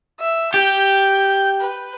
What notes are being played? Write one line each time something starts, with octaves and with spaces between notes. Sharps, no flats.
E5
G4 G6
B4